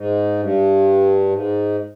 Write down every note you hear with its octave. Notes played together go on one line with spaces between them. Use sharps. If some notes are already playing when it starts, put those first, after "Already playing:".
Already playing: G#2
G2
G#2